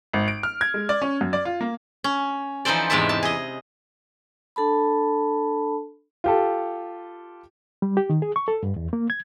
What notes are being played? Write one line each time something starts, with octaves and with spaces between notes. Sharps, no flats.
G#1
D7
F6
G#6
G#3
D5
C#4
F#2
D5
F4
A#3
C#4
E3 F3 D#4 A4 C5 D5
E2 G#2 C3 D5 E5 A5
A5
G#4 D#5
D4 A4 A5 B5
F4 G4 A4
G3
G4
D#3
G#4
C#6
A4
G2
E2
A#3
G#6